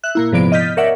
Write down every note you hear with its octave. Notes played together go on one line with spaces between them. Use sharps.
E5 F#6
A#2 A#3 E4
G#2 C3 F3 B3 D5 D7
D#5 F6 G6 A6 B6
A#4 C#5 D5 E5 F#5